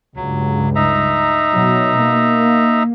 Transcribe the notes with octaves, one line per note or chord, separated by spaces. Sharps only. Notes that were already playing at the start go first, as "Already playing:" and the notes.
C#2 G2 F#3
D#4 E5 A#5
B2 F#3
A#3